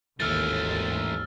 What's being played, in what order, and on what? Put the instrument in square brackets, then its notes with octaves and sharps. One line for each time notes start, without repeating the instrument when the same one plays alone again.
[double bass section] G#1 D#2 [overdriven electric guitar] E3 A3 [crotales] E6 F6 A6